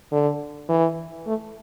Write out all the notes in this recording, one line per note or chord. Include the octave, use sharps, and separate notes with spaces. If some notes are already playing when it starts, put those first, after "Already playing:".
D3
E3
A3